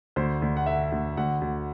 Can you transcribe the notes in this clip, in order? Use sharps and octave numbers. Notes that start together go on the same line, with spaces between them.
D2 C5
D2
F#5
D3 E5
D2
D2 F#5
D2